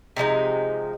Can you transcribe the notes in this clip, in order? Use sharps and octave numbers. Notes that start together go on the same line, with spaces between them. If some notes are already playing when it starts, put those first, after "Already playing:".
C3 F3 G#3 D#4